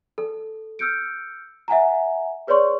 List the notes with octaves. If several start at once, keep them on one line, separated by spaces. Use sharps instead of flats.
A4
E6 F6 G6 C#7 D7
E5 F#5 G#5 A#5
G#4 B4 C#5 D5 C6 C#6